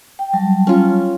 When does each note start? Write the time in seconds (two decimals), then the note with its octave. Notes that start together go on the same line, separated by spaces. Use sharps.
0.19 G5
0.33 F#3 G3 A5
0.67 C#4 F4